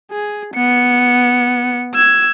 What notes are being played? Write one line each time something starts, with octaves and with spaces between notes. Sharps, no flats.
G#4
B3 C#7
E6 G#6